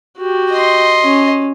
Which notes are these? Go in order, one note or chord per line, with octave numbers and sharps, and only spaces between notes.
F#4 G4
D#5 C6
C#4